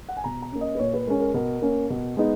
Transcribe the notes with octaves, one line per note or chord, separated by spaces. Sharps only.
F#5
G#5
B2 A#5
A#5
A#3 C#4
D#5
B4
A#2 C#5
B4
G#3 C#4 A#4
A#4
B2 A#4
A#3 C#4
B2
G#3 B3 D#4